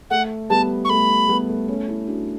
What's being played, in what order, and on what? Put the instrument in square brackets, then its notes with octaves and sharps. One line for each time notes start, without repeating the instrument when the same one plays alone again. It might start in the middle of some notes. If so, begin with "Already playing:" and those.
[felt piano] A3 [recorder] F#5
[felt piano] G3 B3 [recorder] A5
[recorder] C#6
[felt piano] A3 [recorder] B5
[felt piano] G3 B3
A3
A3 C#4
C#4 E4
D4 F#4